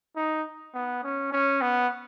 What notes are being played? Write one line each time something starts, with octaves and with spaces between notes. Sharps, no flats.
D#4
B3
C#4
C#4
B3